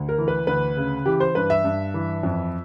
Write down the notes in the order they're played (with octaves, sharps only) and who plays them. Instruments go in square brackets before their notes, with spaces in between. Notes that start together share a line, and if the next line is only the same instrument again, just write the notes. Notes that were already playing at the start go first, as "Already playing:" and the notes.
Already playing: [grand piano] D2
A#4
E3
B4
D2 B4
C#3
E3 G4
C5
G2 B4
E5
G2
E3
F2